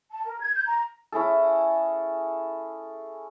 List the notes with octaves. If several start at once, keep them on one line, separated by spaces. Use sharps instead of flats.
A5
A#4
G#6
G6
A#5
C#4 E4 G#4 A4